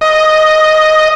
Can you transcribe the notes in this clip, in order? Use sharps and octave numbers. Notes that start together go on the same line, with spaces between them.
D#5